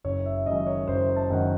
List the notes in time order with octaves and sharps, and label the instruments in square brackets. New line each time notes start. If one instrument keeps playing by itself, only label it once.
[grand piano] F#1 C#5
E5
F#2 D#3 G#3 D#5
C#5
F#1 C5
A5
F#2 D#3 G#3 F#5